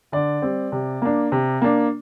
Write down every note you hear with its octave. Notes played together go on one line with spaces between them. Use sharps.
D3 D5
G3 C4
C3
A#3 D4
C3
A#3 D4